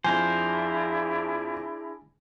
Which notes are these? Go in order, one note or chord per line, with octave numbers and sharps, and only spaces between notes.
F2 D4 E4 G#4 A#4 C5 G#5